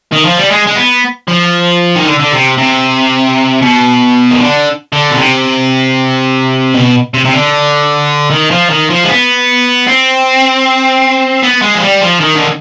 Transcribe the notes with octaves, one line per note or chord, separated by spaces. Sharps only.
D#3
F3
G3
G#3
G#3
B3
F3
D#3
D3
D3
C3
C3
B2
D#3
D3
D3
B2
C3
B2
C3
C3
D3
D#3
F3
D#3
F3
G#3
B3
C4
B3
G#3
F3
G3
F3
D#3
D3